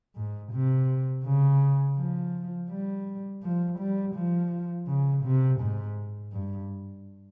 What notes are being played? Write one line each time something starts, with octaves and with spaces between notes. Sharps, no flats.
G#2
C3
C#3
F3
G3
F3
G3
F3
C#3
C3
G#2
G2